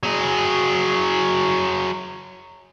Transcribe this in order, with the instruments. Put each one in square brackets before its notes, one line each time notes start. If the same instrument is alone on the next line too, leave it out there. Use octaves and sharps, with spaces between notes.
[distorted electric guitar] F#3 G#4